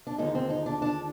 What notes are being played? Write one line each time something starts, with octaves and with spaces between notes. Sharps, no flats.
D4
D#2 D3 F3 G#3 D#4
C4
D#4
D4
D4